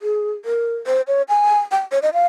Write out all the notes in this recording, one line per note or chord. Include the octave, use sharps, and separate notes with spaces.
G#4
A#4
C5
C#5
G#5
G5
C#5
D#5
F5